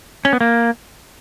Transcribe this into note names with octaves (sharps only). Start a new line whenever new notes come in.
C#4
B3
A#3